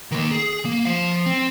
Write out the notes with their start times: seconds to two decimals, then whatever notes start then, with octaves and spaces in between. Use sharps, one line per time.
0.12 D#3 A#3
0.31 G#4
0.65 A#3
0.85 F3 F5
1.26 C4